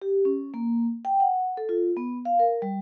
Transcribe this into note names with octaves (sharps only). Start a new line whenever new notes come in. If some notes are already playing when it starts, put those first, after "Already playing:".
G4
C#4
A#3
G5
F#5
A4
F4
B3
F5
A#4
G3